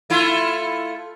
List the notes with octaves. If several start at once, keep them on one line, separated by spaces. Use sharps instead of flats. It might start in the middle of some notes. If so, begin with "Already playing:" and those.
A3 E4 F4